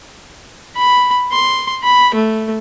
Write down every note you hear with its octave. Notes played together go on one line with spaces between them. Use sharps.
B5
C6
B5
A3